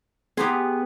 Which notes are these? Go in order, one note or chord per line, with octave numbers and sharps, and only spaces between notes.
B3 G4 G#4 A#5 C6